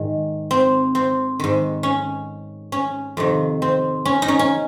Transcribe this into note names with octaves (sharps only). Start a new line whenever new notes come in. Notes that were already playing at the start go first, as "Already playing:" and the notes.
Already playing: G#2 D#3
C4
C4
G#2 D#3
C#4
C#4
F2 C3 D#3
C4
C#4
D#4
C#4
C#4